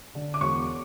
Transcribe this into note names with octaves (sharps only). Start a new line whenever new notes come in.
D3
D6
E1 C#6